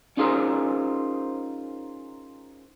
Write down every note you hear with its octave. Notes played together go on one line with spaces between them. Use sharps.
C#4 D#4 F4 G#4 A#4 C5